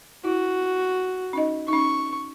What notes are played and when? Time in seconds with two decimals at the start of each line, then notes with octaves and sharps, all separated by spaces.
0.25 E4 F#4
1.33 C#4 D#4 D#5
1.68 C#4 D#4 C#6